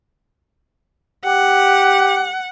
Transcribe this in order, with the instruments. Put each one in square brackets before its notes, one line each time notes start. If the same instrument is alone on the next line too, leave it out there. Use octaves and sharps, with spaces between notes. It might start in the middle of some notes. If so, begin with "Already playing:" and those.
[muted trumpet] G4 [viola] F#5